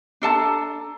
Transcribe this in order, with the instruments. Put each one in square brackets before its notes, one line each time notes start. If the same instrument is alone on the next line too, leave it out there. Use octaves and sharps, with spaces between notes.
[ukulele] D4 A4 A5 A#5